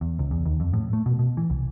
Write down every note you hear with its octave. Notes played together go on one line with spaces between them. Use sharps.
E2
C#2
E2
D#2
F2
A2
A3
B2
B2
E3
C2